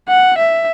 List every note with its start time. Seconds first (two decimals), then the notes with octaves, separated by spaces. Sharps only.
0.09 F#5
0.38 E5